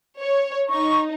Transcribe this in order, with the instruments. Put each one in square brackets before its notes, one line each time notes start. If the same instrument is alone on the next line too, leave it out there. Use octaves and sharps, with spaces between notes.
[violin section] C#5
[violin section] D#4 [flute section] C#6